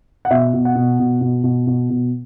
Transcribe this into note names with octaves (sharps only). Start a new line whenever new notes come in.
F#5
B2 E5
B2
F#5
B2
B2
B2
B2
B2
B2